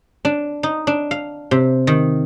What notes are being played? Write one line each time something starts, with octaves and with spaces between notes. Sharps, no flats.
D4
D#4
D4
F5
C3
D#3